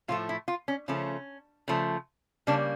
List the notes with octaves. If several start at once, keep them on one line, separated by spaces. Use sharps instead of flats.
A2 F3 A3 F4
E4
F4
C#4
C#3 F3 A3 C#4
C#3 F3 A3
C#3 G3 A#3 D4